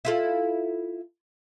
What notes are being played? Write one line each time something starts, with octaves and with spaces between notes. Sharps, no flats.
E4 F4 A4